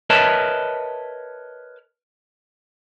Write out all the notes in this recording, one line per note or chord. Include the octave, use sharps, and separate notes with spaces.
A#4 B4 C#5 D#5 E5 A5